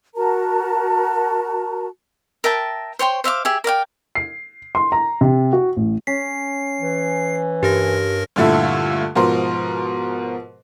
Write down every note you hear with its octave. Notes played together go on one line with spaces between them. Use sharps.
F#4 A#4 A5 A#5
A#4 E5 G5 A5
C5 C#5 G5 C6
C5 E5 F5 D6
G4 G#4 E5
A#4 D5 F5 G5
C7
C6
A#5
C3
F#4
A1
C#4 B6 C7
E3
G2 G4 A#4 A#6
G2 A#2 D3 A3 E4
G#2 B2 F3 A#4 C6